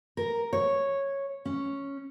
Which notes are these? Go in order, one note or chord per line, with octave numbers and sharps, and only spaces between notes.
A#4
C#5
C#4